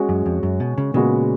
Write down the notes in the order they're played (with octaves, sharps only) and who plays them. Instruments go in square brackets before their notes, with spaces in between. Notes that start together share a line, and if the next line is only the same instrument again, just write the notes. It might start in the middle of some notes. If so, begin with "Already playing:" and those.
Already playing: [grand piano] G#3 C#4 F#4 C#5
[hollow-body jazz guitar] F#2
F2
F#2
B2
C#3
[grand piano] A#2 G#3 B3 F#4 [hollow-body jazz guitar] C#3